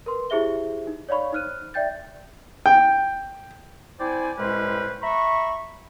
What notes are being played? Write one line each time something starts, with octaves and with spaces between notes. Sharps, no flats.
A#4 B4 C6
E4 G4 G#4 C5 E5 G7
D#4
C#5 D5 F5 B5 C#6
D#4 C5 F6 F#6 D#7
D5 E5 G5 G6 A6
G5
C4 E4 C5 D5 G5 G#5
C2 A2 G#3 C#4 B4 C5
E5 A#5 B5 C#6